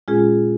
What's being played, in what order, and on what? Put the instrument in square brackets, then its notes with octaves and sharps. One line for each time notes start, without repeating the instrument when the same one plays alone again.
[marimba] A#2 G#3 C#4 F4 G#4